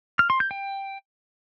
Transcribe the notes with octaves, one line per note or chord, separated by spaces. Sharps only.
F6
C6
G6
G5